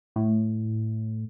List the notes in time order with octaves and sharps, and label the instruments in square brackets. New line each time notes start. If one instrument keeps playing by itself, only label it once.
[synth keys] A2